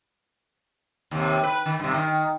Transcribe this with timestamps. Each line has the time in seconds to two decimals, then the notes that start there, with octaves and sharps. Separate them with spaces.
1.11 D#2 C3
1.43 B4
1.66 D#3
1.80 G2 C3
1.94 D#3